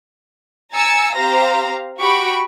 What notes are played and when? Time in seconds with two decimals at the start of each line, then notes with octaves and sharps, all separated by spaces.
0.73 G#5 A#5 E6 A6 C#7
1.15 C4 G4 C5 F5 A#5 A#6
1.99 F#4 G4 B5 C#6 D7